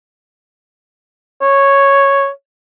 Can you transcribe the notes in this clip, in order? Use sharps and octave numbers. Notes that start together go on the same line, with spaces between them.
C#5